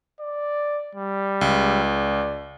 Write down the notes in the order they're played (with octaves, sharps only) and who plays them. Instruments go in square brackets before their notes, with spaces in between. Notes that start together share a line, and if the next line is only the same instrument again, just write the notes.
[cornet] D5
G3
[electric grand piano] C#2
[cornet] D5